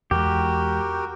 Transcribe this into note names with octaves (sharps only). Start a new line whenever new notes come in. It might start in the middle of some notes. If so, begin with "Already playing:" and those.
E2 G#3 F#4 G4 A#4